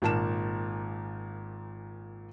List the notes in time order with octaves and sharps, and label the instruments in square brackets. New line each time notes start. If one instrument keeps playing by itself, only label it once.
[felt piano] G#1 A#2 A#4 A5 E7